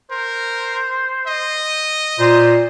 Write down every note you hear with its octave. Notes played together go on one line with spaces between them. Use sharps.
A#4 C5
D#5
A#2 C5